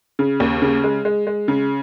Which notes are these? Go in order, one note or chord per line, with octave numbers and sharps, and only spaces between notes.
C#3
D#2
C#3
G#3
G#3
G#3
C#3